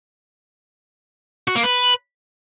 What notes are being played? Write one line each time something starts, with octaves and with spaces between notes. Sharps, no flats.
F#4
A#3
B4